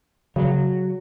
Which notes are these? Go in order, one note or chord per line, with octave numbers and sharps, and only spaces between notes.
C#3 F#3